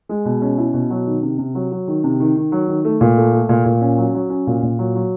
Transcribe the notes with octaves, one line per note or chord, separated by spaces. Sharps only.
G#3
B2
C#4
E4
B2
F#3
D#3
C3
C3
F#3
F#3
D#3
C3
D#3
D#3
F#3
D#3
A3
A#2
A3
A3
A#2
A#2
C#4
F#3
F#3
C#4
A#2
A#2
F#3
F#3